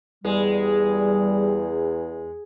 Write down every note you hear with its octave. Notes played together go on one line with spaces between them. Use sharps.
E2 G3 G#3